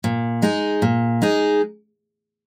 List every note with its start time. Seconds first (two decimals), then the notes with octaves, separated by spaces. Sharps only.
0.04 A#2
0.42 G#3 D#4 G#4
0.82 A#2
1.22 G#3 D#4 G#4